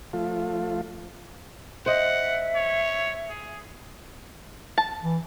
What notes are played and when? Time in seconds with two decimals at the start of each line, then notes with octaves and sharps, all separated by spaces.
0.13 F3 A3 F4
1.86 C5 D#5 E5 F#5
2.55 C#5
3.29 G#4
4.78 A5
5.03 E3